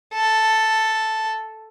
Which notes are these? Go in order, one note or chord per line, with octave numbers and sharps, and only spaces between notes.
A4